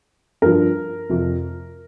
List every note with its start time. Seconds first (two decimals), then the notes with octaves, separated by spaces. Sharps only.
0.42 G2 F3 A#4
1.09 F2 C3 F3